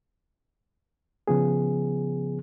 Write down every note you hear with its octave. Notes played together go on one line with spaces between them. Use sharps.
C#3 F3 B3 G#4